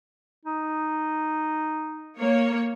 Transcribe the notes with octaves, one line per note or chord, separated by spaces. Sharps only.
D#4
A#3 C#5